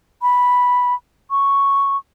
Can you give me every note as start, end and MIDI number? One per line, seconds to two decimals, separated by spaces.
0.22 0.94 83
1.31 1.97 85